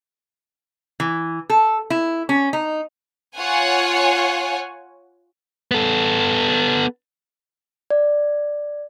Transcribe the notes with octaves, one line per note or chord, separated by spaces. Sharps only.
E3
A4
E4
C#4
D#4
F4 C#5 F#5 G#5
B3 A4
D5